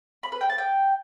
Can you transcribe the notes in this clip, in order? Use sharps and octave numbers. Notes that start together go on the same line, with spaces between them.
B5
B4
G5
A5
G5